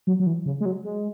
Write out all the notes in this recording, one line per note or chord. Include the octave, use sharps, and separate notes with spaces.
F#3
F#3
E3
C#3
G#3
F#3
G#3